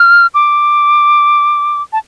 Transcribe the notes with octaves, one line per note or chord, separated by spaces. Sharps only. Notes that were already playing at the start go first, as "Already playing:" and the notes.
Already playing: F6
D6
A5